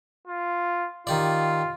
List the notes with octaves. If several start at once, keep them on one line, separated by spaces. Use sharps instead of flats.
F4
D#3 F4 G4 D5